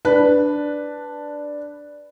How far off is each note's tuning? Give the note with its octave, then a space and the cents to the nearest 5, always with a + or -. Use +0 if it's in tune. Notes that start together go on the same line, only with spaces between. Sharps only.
D4 +0 B4 +0